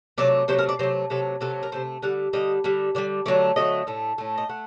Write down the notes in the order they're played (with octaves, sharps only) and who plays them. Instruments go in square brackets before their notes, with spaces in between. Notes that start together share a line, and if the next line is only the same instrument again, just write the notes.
[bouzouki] C3 F#3 A3 D5
C3 F#3 A3 C5
A#4
D5
C3 F#3 A3 C5
C3 F#3 A3 A4
C3 F#3 A3 A4
A#4
C3 F#3 A3 C5
D3 G3 F#5
D3 G3 D#5
D3 G3
D3 G3 D5
D3 F#3 A3 D5
D3 F#3 A3 D#5
A2 A3
A2 A3
D#5
A3 F#5